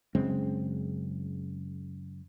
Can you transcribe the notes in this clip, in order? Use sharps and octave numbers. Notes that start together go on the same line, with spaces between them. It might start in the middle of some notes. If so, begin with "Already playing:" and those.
F#2 C#3 G#3 C4